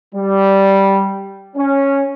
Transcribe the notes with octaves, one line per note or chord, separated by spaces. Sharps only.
G3
C#4